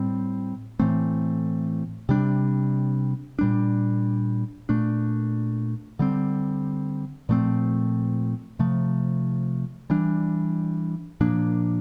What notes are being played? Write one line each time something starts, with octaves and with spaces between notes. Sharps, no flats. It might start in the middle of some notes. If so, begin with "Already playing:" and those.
Already playing: A2 G3 C4
A2 E3 A3 C4
C3 G3 D4
A#2 G3 D4
A#2 A3 D4
D3 G3 C4
A#2 F3 A3 C4
C3 F3 A3
E3 G3 D4
A#2 F3 A#3 D4